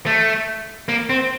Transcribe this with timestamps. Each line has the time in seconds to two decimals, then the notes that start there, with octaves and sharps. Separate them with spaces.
0.06 A3
0.89 A#3
1.10 C4